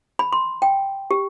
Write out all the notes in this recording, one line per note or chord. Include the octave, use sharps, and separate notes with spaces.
B5
C6
G5
G4